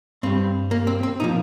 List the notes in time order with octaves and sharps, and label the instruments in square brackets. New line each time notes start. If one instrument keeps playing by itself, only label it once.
[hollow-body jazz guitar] G2 G3 C4
A#3
C4
C4
A#2 F3 D#4